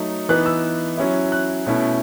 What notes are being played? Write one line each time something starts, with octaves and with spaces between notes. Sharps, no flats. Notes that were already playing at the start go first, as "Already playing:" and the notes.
Already playing: F#3 A3 D#4
E3 B3 D#4 F#6
E6
F#3 C#4 E4
F#6
B2 A3 C#4 E4